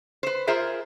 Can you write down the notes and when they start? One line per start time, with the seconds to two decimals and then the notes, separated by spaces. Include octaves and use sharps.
0.23 B4 C5
0.47 F4 G#4 A#4 C5 E5